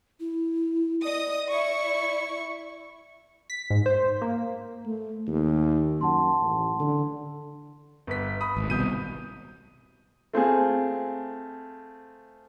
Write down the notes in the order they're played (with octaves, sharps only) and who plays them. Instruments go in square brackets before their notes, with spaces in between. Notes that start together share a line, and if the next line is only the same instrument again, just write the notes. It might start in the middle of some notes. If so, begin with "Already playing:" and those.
[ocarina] E4
[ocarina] D5 [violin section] D#5 D#6
[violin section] E4 C#6
[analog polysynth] B6
G#2
C5
A#3
[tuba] A3
D#2
[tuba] F#2 [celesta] F#5 A5 C6
[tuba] A1
D3
[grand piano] G1 B4 B6
B5 D#6
[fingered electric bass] G#1
[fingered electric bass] C2 B2 [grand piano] D#6 G6 D#7
[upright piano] A3 C4 F4 G#4